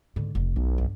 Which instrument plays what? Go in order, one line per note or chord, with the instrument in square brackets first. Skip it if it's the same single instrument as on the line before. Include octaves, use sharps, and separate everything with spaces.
[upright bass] G#2 D3
F1
[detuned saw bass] B1 [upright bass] D#4
[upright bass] G2